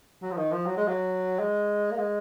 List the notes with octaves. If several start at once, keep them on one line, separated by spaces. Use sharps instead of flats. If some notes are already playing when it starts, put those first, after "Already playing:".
F#3
F3
D#3
F3
F#3
G#3
F#3
G#3
A#3
G#3